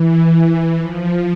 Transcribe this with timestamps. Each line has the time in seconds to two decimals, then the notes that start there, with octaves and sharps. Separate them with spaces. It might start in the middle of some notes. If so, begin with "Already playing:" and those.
Already playing: E3
0.78 F3